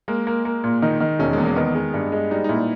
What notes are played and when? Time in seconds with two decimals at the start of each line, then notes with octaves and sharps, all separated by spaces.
0.08 G#3 A#3
0.27 A#3
0.45 A#3
0.64 A#2
0.82 D#3 D#4
1.00 D#3
1.19 E1 C#4
1.33 E2 G#3
1.45 A#3
1.56 D#3 B3
1.75 G#3
1.94 G2
2.12 G#3
2.31 G3 D#4
2.44 D#4
2.49 A#2 E4